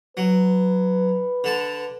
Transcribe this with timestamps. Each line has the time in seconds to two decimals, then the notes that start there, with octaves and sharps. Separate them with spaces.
0.17 F#3 B4
1.44 D3 A5